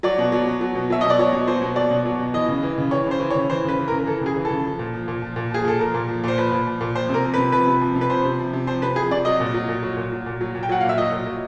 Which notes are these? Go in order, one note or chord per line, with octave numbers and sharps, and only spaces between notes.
F#3 D5
B2
F#3
B2
F#3
B2
F#3 E5
B2 D#5
D5
F#3 C#5
B2
F#3 C5
B2
F#3 D5
B2
F#3
B2
E3 D#5
C#3
E3
C#3
E3 C#5
C#3 C5
E3
C#5
C#3
E3 C5
C#3 B4
E3
A#4
C#3
A#4
E3 A4
C#3 G#4
E3
A4
C#3
F3
A#2
F3
A#2
F3
A#2
F3 G#4
A#2 A4
F3 A#4
A#2
F3
A#2 C5
F3 B4
A#2
F3
A#2
F3 C5
C3 A#4
F3
B4
C3
F3 B4
C3
F3
C3
B4
F3 C5
C3
F3
C3
F3 C5
C3 B4
F3 G#4
C3 D5
F#3 D#5
A#2
F#3
A#2
F#3
A#2
F#3
A#2
F#3
A#2
G5
F#3 F#5
A#2 F5
E5
F#3 D#5
A#2
F#3